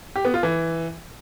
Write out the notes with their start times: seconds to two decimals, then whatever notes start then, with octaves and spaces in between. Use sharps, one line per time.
0.16 G4
0.25 B3
0.34 F4
0.43 E3